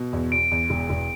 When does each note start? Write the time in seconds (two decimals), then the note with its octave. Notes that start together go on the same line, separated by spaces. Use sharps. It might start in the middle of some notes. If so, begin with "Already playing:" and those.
Already playing: B2
0.13 E2
0.32 E2 D7
0.51 E2
0.70 E1
0.89 E1